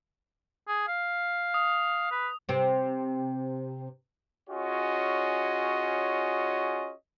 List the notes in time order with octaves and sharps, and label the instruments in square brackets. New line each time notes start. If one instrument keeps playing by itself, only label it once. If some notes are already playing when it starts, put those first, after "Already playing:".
[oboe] G#4
F5
[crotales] D#6
[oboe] B4
[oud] C3 C4
[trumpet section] C#4 F4 F#4 G#4 C#5 D#5